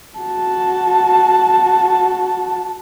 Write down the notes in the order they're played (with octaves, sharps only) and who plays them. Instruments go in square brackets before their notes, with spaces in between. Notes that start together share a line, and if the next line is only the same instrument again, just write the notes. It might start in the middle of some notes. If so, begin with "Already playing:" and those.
[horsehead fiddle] F#4 A5